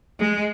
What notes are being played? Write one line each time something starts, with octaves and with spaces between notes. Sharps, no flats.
G#3